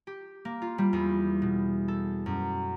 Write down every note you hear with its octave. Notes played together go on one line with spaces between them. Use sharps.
G4
A#3
F4
G3
E2
B2
A4
F#2